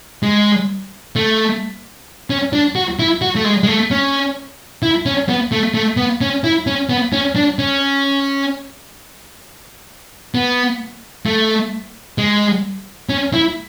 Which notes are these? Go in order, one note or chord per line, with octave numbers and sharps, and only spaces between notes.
G#3
A3
C#4
D4
F#4
E4
F#4
A3
G#3
G#3
A3
C#4
E4
C#4
B3
A3
A3
B3
C#4
E4
C#4
B3
C#4
D4
C#4
B3
A3
G#3
C#4
E4